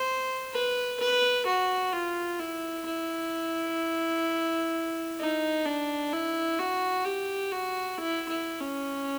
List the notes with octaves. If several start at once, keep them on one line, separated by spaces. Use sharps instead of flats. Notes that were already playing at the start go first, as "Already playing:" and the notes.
Already playing: C5
B4
B4
F#4
F4
E4
E4
D#4
D4
E4
F#4
G4
F#4
E4
E4
C#4